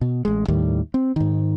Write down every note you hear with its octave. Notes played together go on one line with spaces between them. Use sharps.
B2
A1 G#3
D#2 A2 D#3 G3
C4
G#2 D#3